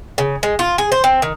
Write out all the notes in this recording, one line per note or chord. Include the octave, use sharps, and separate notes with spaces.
C#3
G#3
F4
G#4
C5
C4
D#3